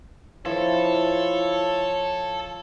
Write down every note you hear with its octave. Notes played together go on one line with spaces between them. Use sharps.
F3 E4 A4 C#5